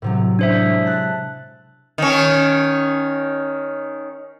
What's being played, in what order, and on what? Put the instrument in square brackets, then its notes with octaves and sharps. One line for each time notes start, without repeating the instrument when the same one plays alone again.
[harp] A2 C3 F#3
[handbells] D4 C5 E5
[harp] G#3
A5 F#6
[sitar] D#3 C#4